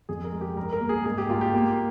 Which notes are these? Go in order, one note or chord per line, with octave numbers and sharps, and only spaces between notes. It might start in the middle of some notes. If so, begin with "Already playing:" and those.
F2 G#4
A#4
G#3
G4
G2 A#4
A#4
A#3
G#4
G#2 G#4
G4
A#3 F4
G4
A#3